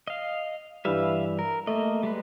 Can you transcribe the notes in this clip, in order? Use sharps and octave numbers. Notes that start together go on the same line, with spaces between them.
D#5 F5
G2 E3 G3 B4 E5 F5
A#4
A3 A#3 D#5
G3 G#3 B4